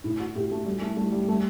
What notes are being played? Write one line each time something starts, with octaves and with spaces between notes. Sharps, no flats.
A2 E4
F#4
A2 G4
A3
G3
A3
G3 A3
G3
G3 A3